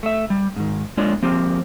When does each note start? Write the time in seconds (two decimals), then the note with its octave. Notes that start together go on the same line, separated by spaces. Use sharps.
0.03 A3 E5
0.30 G3
0.56 G#2 D#3
0.97 G#3 A#3 D4 F4 C#5 D5
1.22 F3 A#3 C4 G4